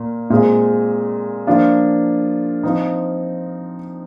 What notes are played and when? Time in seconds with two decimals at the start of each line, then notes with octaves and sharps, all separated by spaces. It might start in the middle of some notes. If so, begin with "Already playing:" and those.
Already playing: A#2 A#3
0.30 A#2 G#3 C4
1.47 F3 A#3 D4 F4
2.63 F3 C4 D#4